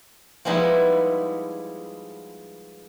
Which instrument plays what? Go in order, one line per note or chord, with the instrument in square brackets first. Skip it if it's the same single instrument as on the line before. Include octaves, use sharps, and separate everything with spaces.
[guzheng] F3 G3 G#3 B3 D#4 E4